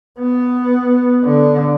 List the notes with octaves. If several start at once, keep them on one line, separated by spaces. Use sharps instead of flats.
B3
D3